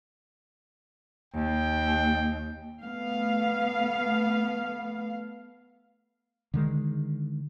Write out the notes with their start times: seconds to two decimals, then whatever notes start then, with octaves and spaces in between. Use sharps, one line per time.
1.34 D#2 G5
2.82 A3 B3 F5
6.54 D3 D#3 G#3